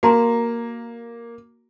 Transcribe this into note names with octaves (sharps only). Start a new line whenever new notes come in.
A#3 F#4 A#5 C6